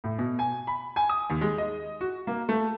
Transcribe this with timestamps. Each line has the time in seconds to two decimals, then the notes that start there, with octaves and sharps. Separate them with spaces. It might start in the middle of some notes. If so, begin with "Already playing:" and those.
0.04 A2
0.19 B2
0.39 G#5
0.67 B5
0.96 G#5
1.09 D#6
1.30 D#2
1.41 G#3
1.58 D#5
2.01 F#4
2.27 A#3
2.49 A3